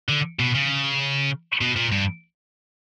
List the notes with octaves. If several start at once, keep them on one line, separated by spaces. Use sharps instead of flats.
D3
B2
C#3
B2
A#2
G2